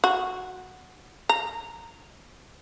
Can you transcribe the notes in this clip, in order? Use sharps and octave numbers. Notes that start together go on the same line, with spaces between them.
F#4
A#5